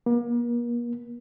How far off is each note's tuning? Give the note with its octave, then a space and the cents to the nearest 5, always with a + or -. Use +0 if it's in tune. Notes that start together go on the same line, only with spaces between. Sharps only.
A#3 +40